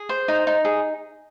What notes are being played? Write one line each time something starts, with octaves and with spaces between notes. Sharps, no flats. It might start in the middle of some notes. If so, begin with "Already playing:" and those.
Already playing: G#4
C5
D#4
D#4
G#4